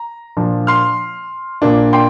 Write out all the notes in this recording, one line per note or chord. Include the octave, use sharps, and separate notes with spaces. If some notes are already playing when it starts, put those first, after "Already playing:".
Already playing: A#5
A#2 F3 D4
C6 F6
A#2 A#3 D4
G5 C6